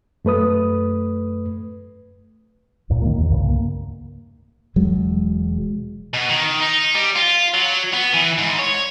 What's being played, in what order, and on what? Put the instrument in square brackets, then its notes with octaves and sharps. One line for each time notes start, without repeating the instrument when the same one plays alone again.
[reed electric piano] F#2 A3 B4 D#6
[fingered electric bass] C#2 G2 A#2
D#3 F#3 G3 A#3
D#2
C2 G2 C#3
A#3
E1 F#3 G#3
[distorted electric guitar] B2
D#3
D#4
G3
F4
F#3
B3
E3
G#2
C#5